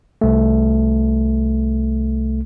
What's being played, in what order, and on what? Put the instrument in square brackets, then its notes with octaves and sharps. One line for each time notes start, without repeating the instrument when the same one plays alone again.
[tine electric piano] C2 A3